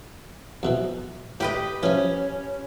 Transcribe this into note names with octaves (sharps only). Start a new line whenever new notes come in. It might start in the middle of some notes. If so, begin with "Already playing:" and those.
F2 B2 E3
A2 G4 B4 D#5
E3 F3 C#4